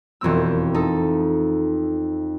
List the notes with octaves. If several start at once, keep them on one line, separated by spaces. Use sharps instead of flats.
E1 F2 C4 E6
D#4 A4